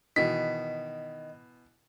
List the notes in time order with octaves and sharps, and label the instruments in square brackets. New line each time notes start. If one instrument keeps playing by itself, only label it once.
[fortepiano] B2 E3 [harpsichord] D#3 [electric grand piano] B6